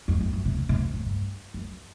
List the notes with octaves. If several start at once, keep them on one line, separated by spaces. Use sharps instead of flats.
F2
F2
F#2
C3
C#3
C3
C3
A2
G2
F#2